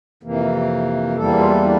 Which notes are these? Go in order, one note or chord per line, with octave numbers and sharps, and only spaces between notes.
F2 C3 E3 A#3
E2 E3 G3 A#3 A4
F4
E4
D4